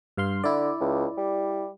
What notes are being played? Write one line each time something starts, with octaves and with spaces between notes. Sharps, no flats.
G2 F5 C6
D3 E4 D5
C#2
G3